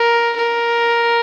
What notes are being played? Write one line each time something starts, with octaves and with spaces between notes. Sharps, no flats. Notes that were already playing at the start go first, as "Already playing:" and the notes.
Already playing: A#4
A#4